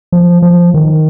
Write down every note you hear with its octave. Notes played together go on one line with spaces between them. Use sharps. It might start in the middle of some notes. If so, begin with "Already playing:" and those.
F3
F3
D#3